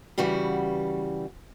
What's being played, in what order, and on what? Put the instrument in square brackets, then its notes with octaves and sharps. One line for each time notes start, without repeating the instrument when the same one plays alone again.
[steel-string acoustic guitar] C#3 E3 G3 F#4